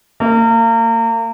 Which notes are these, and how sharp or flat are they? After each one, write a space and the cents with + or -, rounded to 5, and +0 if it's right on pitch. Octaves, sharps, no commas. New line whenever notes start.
A#3 -35